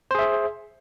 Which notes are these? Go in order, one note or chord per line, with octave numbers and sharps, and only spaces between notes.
G#4 C5 E5